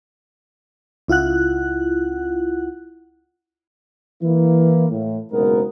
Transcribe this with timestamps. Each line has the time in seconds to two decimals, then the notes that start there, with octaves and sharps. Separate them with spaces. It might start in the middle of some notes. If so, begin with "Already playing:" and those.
1.08 C#2 E4 F4 F#5 F#6
4.22 E3 A#3 E4
4.90 A2
5.31 F#1 G#2 B2 B3 A#4